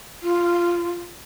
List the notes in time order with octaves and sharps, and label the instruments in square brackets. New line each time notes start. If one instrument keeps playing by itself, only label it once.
[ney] F4